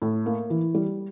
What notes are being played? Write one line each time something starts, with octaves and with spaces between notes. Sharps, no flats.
A2
A#3
E3
G3